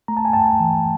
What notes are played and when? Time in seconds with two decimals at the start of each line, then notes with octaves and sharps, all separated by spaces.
0.08 A3 A#5
0.17 A5
0.25 G#5
0.33 G2 G5 A5
0.60 E3